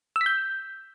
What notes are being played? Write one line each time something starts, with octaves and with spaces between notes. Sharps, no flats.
E6
B6
G6